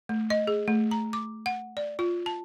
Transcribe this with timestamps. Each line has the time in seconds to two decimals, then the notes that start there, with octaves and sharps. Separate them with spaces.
0.09 A3
0.30 D#5
0.47 G#4
0.68 A3
0.91 A#5
1.13 D6
1.46 F#5
1.77 D5
1.99 F4
2.26 A5